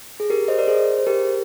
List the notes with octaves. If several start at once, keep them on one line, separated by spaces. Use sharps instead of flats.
G#4
G4 A#4
C5 D#5
A#4 D5
G#4 C5
C5
G4 A#4